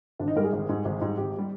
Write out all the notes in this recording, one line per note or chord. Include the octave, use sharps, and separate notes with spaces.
G#1 D4
D#4
G#2 G3 A#4
G#4
G#1
G#2 G3
G#1
G#2 G3
G#1 G4
G3